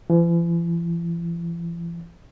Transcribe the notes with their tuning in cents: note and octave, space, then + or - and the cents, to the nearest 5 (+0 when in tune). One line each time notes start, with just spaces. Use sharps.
E3 +45